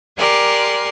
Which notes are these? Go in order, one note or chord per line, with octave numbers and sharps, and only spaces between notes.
G4 A#4 D5 G#5 C6 F#6